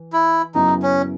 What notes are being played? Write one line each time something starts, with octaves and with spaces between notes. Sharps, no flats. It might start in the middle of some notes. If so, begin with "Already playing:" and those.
Already playing: E3
E4
F#2 C#3 F#3 B3 D#4 E4
C#4